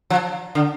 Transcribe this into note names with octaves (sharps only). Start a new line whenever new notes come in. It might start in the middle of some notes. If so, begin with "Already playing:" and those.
F3
D3